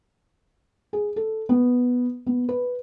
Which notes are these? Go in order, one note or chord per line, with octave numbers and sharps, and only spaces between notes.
G#4
A4
B3
B3
B4